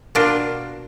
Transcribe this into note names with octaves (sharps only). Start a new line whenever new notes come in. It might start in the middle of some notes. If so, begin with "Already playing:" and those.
B2 A#3 D4 F4 A#4